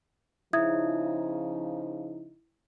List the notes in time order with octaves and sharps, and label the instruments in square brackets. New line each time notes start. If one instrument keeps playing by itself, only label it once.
[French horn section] C#3 F3 D#4 [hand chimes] E4 [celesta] E5 D#6 G#6